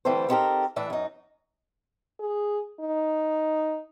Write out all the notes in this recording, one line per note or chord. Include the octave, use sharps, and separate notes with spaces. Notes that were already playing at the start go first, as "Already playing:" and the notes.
D2 E3 G3 C4 A4 C5
B3 C4 D#4 G4 A4 A#4
A2 E3 D4 E5
F#2 D#4
G#4
D#4